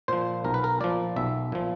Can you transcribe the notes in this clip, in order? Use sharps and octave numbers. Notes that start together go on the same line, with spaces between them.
A#2 F3 C5
B1 A#4
B4
A#4
A#2 F3 D5
B1 E5
A#2 F3